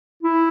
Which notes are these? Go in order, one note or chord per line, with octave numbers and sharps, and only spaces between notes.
E4